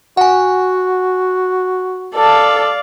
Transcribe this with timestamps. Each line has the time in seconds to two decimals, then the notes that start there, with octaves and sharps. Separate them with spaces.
0.17 F#4 F#5 G#5
2.15 A4 D5 F5 A5